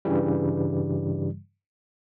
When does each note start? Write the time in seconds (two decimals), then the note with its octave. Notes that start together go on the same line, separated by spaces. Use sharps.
0.05 G2 C#3 E3 G3